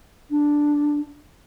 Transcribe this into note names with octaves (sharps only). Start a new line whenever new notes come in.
D4